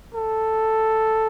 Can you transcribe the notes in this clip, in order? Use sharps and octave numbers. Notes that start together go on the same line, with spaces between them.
A4